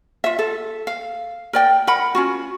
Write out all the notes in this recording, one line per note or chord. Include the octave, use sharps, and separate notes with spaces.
F4 E5
A4
F5
A#4 D5 G5
A#4 F#5 B5
C#4 F4 F#4